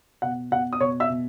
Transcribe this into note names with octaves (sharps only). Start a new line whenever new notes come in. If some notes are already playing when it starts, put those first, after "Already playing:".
B2 F#5
B2 F#5
D#6
B2 C#5 C#6
E5 E6
B2